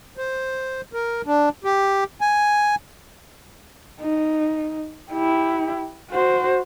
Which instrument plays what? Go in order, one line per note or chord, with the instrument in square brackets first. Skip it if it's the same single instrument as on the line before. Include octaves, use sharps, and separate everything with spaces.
[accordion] C5
A#4
D4
G4
G#5
[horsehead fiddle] D#4
E4 G4
F#4 C5